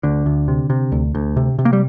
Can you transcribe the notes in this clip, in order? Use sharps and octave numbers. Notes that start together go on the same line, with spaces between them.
D2 D3
D2
C3
C3
D2
D2
C3
C3
A#3
G3